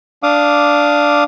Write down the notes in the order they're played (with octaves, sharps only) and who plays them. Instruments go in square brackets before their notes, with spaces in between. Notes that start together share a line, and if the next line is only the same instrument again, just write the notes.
[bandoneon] D4 F5 D6 D#6